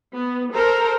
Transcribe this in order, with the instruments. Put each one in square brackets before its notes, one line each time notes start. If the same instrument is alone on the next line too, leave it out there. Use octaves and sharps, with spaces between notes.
[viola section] B3
A4 A#4 C5 A#5